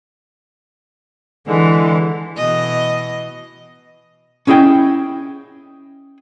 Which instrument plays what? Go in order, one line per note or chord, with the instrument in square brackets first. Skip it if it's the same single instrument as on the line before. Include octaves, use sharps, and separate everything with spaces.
[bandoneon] D3 G#3 [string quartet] E3
[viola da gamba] B2 E3 D#5
[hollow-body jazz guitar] C#4 E4 G#4 D#5 G5